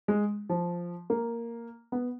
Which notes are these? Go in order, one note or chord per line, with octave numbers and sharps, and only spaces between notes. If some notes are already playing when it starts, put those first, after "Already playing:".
G#3
F3
A#3
B3